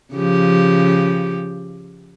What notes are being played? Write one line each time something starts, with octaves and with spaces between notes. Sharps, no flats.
C#3 F3 G4